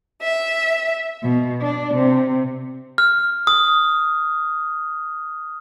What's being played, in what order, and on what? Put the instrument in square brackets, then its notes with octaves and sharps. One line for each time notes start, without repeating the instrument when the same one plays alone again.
[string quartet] E5
B2
D4
C3
[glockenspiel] F6
D#6